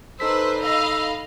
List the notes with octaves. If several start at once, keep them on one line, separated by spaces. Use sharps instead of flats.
D#4 A4 B4 C5 E6 B6
D#5 F5 B5 E6